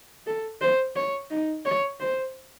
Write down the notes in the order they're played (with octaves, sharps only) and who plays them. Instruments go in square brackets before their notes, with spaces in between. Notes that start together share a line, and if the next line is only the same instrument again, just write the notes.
[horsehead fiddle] A4
C5
C#5
D#4
C#5
C5